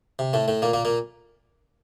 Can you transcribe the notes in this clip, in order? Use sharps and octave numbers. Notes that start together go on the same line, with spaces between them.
C3
A2 A3
A2 A3
A#2 A#3
A#2 A#3
A#2 A#3